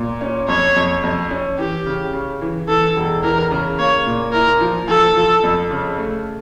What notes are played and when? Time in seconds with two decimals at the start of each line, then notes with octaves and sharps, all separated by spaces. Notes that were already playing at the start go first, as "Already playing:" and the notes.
Already playing: A#2
0.21 C#4
0.48 F2 C#5
0.76 F2
1.04 F2
1.31 C#4
1.58 E3 G4
1.86 C#3
2.13 C#3
2.41 E3
2.68 E3 A4
2.96 E1
3.23 E3 A#4
3.51 C#3
3.78 A#3 C#5
4.06 A#2
4.33 E4 A#4
4.60 F3
4.88 F3 A4
5.16 F3
5.43 F2
5.71 C#3
5.98 A3